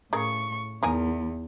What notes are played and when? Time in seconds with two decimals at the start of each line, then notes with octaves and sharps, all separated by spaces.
0.13 A2 C#3 G#4 A#4 C#6
0.83 E2 D#3 A#4 G#5